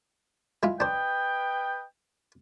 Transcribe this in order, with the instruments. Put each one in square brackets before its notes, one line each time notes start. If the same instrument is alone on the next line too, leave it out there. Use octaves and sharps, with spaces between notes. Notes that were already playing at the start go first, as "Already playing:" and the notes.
[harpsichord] G#3 E4 F4
[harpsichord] D4 C5 [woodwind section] B4 D#5 G5